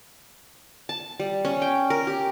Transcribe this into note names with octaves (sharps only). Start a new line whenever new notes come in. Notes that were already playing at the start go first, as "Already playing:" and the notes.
A5
G3
C#4
G5
A#4
G4